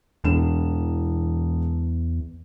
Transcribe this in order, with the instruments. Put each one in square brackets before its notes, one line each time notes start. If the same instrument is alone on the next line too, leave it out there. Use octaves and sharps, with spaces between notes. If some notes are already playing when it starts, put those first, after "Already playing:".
[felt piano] E1 E7 [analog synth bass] E2